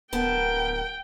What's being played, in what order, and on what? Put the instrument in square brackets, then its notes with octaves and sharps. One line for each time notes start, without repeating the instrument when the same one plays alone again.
[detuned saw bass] D1 [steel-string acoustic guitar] B3 A5 [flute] A#4 [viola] G5